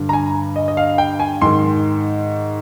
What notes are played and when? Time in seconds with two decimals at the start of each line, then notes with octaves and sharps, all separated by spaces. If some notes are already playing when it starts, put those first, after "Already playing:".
Already playing: G2 D3
0.09 A#5
0.13 G#5
0.56 D#5
0.68 D#5
0.77 F5
0.98 G5
1.20 G#5
1.42 G#2 D#3 C6